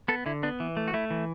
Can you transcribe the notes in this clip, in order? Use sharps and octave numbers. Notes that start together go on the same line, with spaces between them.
B3 A4
D3 E4
B3 D4
E3
A3
F#4
A3 E4
E3